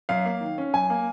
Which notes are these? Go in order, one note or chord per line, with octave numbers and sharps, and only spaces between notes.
F#2 F5
A#3
D#3
C#4
F#2 G#5
A#3